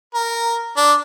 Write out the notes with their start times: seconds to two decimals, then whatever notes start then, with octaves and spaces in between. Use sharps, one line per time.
0.15 A#4
0.77 D4